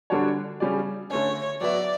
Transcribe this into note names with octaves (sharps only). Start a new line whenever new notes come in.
D3 G3 D4 F#4 C#5
C#3 G3 C#4 G4 D5
D3 A3 C#4 C#5
F#3 B3 F#4 B4 D5 E5